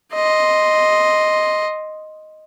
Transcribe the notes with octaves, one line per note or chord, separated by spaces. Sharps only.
D#5 C6